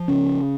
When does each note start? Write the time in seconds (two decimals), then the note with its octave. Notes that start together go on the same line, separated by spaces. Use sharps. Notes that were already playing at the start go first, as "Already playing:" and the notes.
Already playing: F3
0.08 C#3 C#4